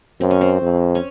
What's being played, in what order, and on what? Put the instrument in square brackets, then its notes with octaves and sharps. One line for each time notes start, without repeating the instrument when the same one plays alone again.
[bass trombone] F#2 [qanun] C4
[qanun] C#4
C4
[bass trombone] F2
[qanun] C#4